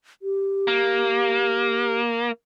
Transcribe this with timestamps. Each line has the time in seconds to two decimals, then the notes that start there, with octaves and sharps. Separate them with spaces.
0.22 G4
0.68 A#3